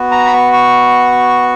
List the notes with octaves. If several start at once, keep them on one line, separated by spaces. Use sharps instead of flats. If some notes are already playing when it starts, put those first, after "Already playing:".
Already playing: B3 F#4
A#5
B5
C#6
C#6